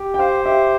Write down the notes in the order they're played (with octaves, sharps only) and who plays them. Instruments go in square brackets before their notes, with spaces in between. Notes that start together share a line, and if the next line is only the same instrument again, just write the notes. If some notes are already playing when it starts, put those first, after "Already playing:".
Already playing: [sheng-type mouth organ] G4
[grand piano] G5
[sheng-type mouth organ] C5 [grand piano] F5
[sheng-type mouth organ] G4 [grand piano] E5